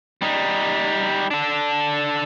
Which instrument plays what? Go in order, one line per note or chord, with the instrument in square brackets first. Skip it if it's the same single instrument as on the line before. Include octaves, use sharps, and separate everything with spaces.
[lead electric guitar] G3 D#4
D4 A4